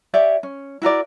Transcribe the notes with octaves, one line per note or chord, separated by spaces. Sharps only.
G4 C#5 D5 E5
C#4
E4 F#4 A#4 D5